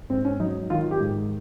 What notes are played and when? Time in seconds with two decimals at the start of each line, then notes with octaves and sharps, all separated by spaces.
0.10 G#2 C4
0.25 C#4
0.40 F#3 D#4
0.70 D#3 F4
0.91 G4
1.00 G#2